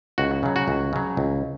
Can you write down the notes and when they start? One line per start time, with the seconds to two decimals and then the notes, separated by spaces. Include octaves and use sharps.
0.18 C#2 F#4
0.43 C#3 F#3
0.56 F#4
0.68 C#2
0.93 C#3 F#3
1.17 C#2